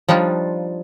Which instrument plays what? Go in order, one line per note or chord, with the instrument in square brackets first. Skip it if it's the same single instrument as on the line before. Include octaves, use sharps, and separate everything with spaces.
[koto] F3 G3 D4 D#4 F4